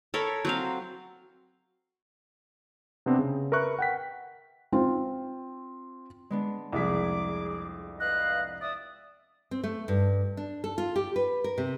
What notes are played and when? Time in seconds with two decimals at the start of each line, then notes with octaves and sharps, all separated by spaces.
0.14 A4 A#4 C#5 B5
0.45 F#3 C4 F5
3.06 C3 B3 C4 D4
3.19 C#3
3.52 A#4 B4 E5 C#6 F#6
3.79 F#5 G5 B6
4.72 C4 F4
6.30 G#3 B3 D4
6.72 C2 F2 G#4 D6 B6
8.00 B4 D#5 F5 F#6
8.61 D5 E5 D#6
9.51 C4
9.64 A3
9.88 G2
10.37 D4
10.64 A4
10.78 F4
10.96 G4
11.16 B4
11.44 A#4
11.58 C3